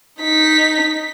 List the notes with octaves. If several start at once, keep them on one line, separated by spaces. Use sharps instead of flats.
D#4 B6